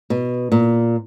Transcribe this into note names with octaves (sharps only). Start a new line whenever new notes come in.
B2
A#2